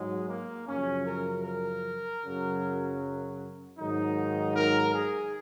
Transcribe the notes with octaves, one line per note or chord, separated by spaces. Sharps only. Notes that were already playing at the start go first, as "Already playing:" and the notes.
Already playing: G#2 F#3 G#3
A#3
F#2 C#3 F3 C#4
A#4
A#4
F#2 C#3 F#3
G#2 D#3 F#3 D#4
A#4
G#4